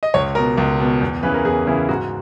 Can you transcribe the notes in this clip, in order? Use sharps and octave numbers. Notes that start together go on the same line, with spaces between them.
D#5
C#2 C#5
B2 A#4
C#2
B2
E2
C#3 E3 B4
A#4
E2 G#4
C#3 E3 E4
G#2 F#4